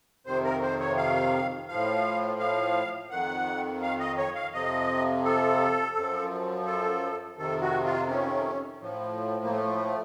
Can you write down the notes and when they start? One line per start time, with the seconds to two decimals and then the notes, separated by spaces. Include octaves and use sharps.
0.26 F2 C3 D#3 C5
0.44 A#4
0.62 C5
0.80 C#5
0.97 F5
1.69 A2 F3 F5
2.40 F5
3.11 F2 D#3 F#5
3.82 F5
4.00 D#5
4.18 C#5
4.35 F5
4.53 F2 C3 F3 D#5
5.25 A4
5.96 F#2 F3
6.66 A4
7.37 F2 C3 D#3 A4
7.61 F#4
7.84 F4
8.09 C#4
8.80 A2 F3
9.44 A#3
9.51 A3